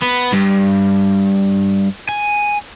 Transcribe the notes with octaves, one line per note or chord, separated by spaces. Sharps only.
B3
G2
G#5